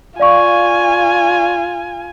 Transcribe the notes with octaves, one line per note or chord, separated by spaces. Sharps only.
F4 D5 F5 G#5 C#6